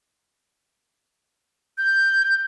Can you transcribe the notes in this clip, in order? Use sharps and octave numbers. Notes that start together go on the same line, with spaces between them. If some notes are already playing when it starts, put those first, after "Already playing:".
G6